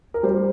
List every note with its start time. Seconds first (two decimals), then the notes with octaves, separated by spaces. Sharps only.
0.14 A#4
0.23 G3 C5